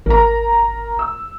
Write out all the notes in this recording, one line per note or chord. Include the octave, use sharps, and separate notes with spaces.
G#1 A#4 A#5
E6